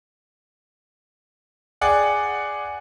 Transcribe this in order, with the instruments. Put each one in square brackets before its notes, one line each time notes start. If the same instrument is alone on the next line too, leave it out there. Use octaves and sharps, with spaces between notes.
[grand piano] G#4 D5 F#5 G5